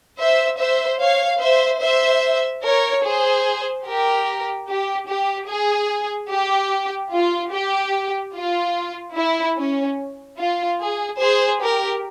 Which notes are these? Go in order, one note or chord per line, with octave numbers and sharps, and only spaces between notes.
C5 E5
C5 E5
C#5 F5
C5 E5
C5 E5
A#4 C#5
G#4 C5
G4 A#4
G4
G4
G#4
G4
F4
G4
F4
E4
C#4
F4
G#4
G#4 C5
G4 A#4